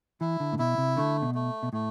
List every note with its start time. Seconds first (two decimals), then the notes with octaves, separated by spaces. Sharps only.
0.21 E3 E4
0.40 D3
0.53 A2
0.59 B2 E4
0.78 C3
0.97 D3 A3
1.22 B2
1.35 A3
1.63 B2
1.73 A2 A3